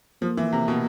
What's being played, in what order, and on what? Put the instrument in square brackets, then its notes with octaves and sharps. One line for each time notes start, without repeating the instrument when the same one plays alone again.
[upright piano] F3 [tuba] A#3
[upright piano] E3
C3
B2